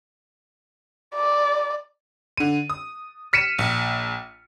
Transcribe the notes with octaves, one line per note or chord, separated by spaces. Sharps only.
D5
D3 D#7
D#6
F6 B6 C#7 D#7 E7
A#1